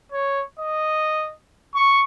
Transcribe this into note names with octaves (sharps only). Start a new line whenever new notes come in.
C#5
D#5
C#6